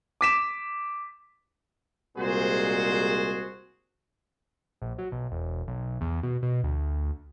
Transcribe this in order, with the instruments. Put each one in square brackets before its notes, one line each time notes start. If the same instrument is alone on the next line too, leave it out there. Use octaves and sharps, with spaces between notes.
[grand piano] D6 B6 E7
[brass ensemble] C2 A#2 G#3 F#4 G#4 C5
[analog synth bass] A#1
F#3
B1
E1
B1
E2
B2
B2
D2